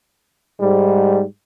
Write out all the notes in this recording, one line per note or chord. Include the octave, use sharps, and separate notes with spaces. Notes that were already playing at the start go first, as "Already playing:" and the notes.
G#2 G3